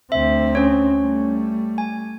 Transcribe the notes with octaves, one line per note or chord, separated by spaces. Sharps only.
D2 C4 E5
C#4 C#5
G3 A3
G#5